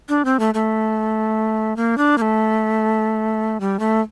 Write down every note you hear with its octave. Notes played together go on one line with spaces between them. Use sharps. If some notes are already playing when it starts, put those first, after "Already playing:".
D4
C4
A3
A3
A#3
D4
A#3
A3
G3
A3